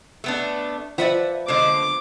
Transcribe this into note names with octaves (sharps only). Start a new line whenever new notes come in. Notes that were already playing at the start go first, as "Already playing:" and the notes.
A3 B3 D4
F3 B4 D5 E5 F#5
D3 G#3 C5 D6